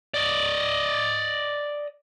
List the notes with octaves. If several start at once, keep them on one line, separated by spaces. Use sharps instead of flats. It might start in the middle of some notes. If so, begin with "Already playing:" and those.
D5 D#5